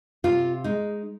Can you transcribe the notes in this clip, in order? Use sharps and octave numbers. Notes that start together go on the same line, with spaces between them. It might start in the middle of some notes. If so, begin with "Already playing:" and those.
C3 F4
G#3 D#4